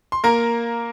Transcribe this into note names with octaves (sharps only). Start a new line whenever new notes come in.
C6
A#3 A#4 A#5